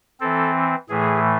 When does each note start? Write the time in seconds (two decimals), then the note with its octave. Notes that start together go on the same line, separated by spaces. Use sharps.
0.20 E3 C4 A4
0.89 A2 E3 A3 G#4